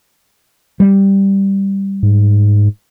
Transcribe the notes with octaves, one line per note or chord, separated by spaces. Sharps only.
G3
G#2